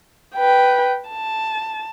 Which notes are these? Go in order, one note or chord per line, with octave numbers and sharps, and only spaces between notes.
B4 G5
A5